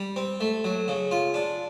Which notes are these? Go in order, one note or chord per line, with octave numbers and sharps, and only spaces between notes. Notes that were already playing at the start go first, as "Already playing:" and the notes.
Already playing: G3
C4
A3
F#3
C#3
F4
D4